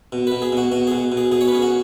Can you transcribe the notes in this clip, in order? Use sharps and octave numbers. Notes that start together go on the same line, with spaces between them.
B2
B2 B4
G#4
B2 F#4
B2 F#4
B2 G#4
B2
G#4
B2 G#4
C#5
B4
C#4 G#4
F#4